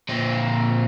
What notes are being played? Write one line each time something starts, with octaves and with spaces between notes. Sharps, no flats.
A#2 C4